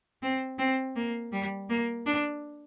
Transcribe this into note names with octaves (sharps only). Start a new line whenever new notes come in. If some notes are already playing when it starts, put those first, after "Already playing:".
C4
C4
A#3
G3
A#3
D4